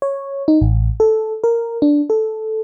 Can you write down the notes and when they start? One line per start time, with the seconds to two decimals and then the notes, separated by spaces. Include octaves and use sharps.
0.02 C#5
0.48 D#4
0.61 A1
1.00 A4
1.44 A#4
1.82 D4
2.10 A4